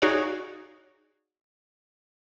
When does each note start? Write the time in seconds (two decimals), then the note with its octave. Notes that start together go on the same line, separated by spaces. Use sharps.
0.02 D#4 F#4 G#4 C#5 D5 F5